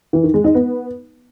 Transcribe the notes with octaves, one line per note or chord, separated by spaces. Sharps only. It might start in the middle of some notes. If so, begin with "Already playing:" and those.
E3
D#3
G#3
D#4
B3